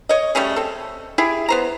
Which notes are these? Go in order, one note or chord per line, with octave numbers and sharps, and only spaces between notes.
C#5 D#5
G3 A3 C#4 G#4
C4 A4
E4 G4 G#4
B3 C5 A#5